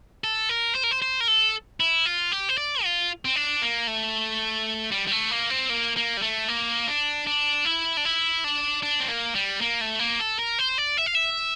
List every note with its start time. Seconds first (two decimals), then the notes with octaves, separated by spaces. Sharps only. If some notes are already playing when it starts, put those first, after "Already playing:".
0.24 A4
0.49 A#4
0.75 C5
0.84 A#4
0.91 C5
1.02 C5
1.20 A#4
1.28 A4
1.80 E4
2.06 F4
2.32 G4
2.49 C5
2.58 D5
2.84 F4
3.25 C4
3.36 D4
3.62 A#3
3.87 A3
4.91 G3
5.07 G3
5.12 A3
5.31 A#3
5.50 C4
5.70 A#3
5.97 A#3
6.17 G3
6.22 A3
6.48 A#3
6.88 D4
7.27 D4
7.65 E4
7.97 D4
8.05 E4
8.44 D4
8.83 D4
9.00 C4
9.08 A#3
9.35 G3
9.61 A#3
9.81 A3
9.99 A#3
10.20 A4
10.39 A#4
10.59 C5
10.78 D5
10.97 E5
11.06 F5
11.15 E5